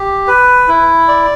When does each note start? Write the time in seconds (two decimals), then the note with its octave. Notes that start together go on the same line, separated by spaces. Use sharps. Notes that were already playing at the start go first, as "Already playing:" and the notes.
Already playing: G4
0.27 B4
0.68 E4
1.08 D5